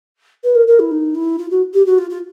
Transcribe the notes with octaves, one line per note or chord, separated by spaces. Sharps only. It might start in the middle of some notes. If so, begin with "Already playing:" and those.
B4
A#4
A#4
E4
D#4
E4
F4
F#4
G4
F#4
F4
F4